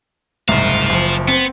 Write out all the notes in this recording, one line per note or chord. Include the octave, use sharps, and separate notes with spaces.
F#1 C2 G#2 C5 F5
F#1 F3
B3 C4